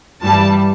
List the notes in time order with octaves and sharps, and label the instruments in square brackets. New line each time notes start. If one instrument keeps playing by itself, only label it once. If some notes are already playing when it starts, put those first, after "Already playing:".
[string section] G2 E3 G3 A5